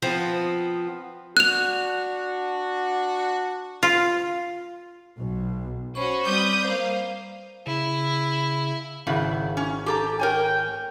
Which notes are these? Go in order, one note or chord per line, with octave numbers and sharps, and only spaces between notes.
F3 B3 C4
D4 F#4 F#6 F7
F4
B1
C#4 F#4 C5 B5 C#6
G3 C4 B4 D6 D#6 G6
A#3 C5 F5
C#3 E4
G#1 C#3 E4 F#5
C#4
G4 A4 A#5
A#4 C#5 G5 G#5